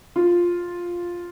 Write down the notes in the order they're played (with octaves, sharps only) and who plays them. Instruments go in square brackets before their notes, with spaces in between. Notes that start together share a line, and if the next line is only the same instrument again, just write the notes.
[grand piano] F4